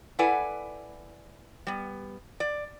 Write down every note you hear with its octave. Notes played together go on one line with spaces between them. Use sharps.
E4 A4 B4 D5 F#5 G#5
G3 B3
D5